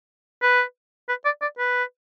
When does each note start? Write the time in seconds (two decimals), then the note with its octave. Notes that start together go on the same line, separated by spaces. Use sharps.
0.42 B4
1.09 B4
1.25 D5
1.42 D5
1.58 B4